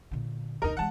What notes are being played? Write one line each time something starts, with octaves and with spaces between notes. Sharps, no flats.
A#2 D3
F1 D#2 D#4 A#4
E3 G#3 F#5 A5